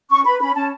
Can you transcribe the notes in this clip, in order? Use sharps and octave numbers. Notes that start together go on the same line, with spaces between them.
C#4 C#6
B4 B5
C#4 B5
C#4 A5